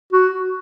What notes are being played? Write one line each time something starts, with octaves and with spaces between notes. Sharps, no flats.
F#4